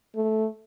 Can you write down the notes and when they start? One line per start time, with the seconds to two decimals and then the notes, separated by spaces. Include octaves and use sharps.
0.16 A3